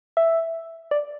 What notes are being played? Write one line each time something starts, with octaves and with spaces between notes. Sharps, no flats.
E5
D5